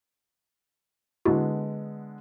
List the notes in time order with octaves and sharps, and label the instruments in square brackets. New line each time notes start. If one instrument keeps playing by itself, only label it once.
[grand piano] D3 G#3 B3 [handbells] E4 F#4